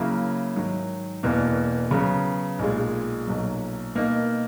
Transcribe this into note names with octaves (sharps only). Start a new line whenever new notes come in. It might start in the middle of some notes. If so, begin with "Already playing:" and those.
Already playing: C#3 F#3 A#3 E4
G#2 D#3 F#3
E1 E2 B2 A#3
C#3 F#3 B3
B1 A#2 G#3
B1 A#2 F#3
B2 A#3 D#4 A#4